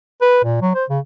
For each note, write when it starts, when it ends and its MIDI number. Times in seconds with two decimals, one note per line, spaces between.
0.22 0.43 71
0.44 0.58 46
0.62 0.71 54
0.74 0.84 72
0.90 0.99 49